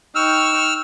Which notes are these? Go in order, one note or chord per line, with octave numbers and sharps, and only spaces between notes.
D#4 G5 C#6 E6 F6